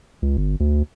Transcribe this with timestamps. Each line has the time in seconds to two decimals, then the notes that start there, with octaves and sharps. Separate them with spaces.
0.22 C#2
0.37 G1
0.60 D2